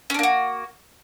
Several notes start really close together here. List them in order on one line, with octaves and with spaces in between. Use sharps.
C#4 D4 A#3 F#4